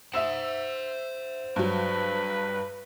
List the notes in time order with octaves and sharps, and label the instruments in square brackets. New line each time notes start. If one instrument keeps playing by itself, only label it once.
[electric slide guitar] C5 F#5 [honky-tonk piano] E5 E6 E7
[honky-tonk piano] G2 F#3 [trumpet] B4